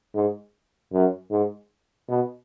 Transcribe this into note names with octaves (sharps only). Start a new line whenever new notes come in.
G#2
F#2
G#2
B2